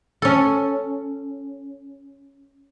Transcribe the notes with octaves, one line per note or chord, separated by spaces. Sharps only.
C#4 A4